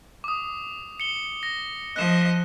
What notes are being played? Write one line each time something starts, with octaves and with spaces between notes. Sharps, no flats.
D6 D#6
C#7 G7
A#6
F3 D#5 F#6 E7